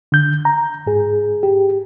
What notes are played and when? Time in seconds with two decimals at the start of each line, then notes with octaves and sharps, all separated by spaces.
0.12 D3 G6
0.45 A#5
0.87 G#2 G#4
1.43 G4